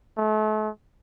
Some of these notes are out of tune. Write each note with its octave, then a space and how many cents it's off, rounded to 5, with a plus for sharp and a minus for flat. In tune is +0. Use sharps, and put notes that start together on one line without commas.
A3 -40